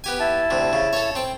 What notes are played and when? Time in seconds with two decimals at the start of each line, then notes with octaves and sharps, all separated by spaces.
0.04 B3 G4 G#5
0.20 E4 A5
0.50 D2 C3
0.73 C#3
0.93 A4 C#5
1.15 C4 G5